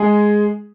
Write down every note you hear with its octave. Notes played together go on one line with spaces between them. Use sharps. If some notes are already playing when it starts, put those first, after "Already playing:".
Already playing: G#3 G#4